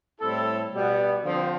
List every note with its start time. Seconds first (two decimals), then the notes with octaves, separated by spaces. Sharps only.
0.20 A2 G3 C4 E4 A4
0.73 B2 G3 B3
1.25 D3 F3 C4